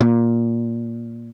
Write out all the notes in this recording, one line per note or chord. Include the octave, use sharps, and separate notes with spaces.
A#2